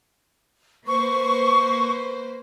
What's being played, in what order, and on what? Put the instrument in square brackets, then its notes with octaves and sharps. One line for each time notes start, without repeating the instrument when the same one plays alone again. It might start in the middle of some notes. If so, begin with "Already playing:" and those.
[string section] A#3 B4 C5 [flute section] C#6